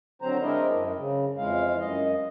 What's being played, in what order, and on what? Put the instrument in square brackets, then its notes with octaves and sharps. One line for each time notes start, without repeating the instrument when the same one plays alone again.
[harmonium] D3 F#3 C4 C5 A#5
G#3 C4 D4 E4 A#4 D#5
F#2
C#3
F2 E3 G#3 F5
F#2 D#5